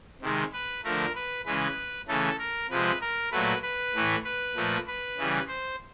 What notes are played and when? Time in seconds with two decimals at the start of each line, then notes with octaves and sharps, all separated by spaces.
0.21 C3 D#3 G#3
0.53 B4
0.84 D3 F3 A3 A#4
1.15 B4
1.45 C#3 E3 G#3 B4
2.08 C#3 E3 A3 A4
2.39 A#4
2.70 C3 F3 G#3 B4
3.01 A#4
3.31 A#2 F#3 A3 B4
3.62 B4
3.94 A2 E3 A3
4.24 B4
4.55 A#2 F3 A3
4.87 B4
5.18 C#3 E3 G3
5.48 C5